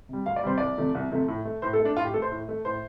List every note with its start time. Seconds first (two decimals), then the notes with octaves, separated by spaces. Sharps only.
0.09 C3 G3
0.26 D2 F5
0.36 D5
0.43 C3 G3 C5
0.58 C2 D5
0.78 C3 F3 A3
0.95 C2
1.11 C3 F3 A3
1.28 A2
1.45 A3
1.62 A2 C5
1.73 A4
1.79 A3
1.85 D4
1.97 A2 F4
2.05 G4
2.14 A3 A4
2.22 C5
2.32 A2
2.49 A3
2.65 A2 C5